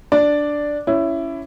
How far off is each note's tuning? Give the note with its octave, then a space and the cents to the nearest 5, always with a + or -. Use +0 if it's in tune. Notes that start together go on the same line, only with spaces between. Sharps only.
D4 +0 D5 +0
C#4 +10 E4 +15